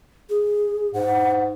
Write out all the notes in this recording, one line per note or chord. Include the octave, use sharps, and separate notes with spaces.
G#4
G#2 F#5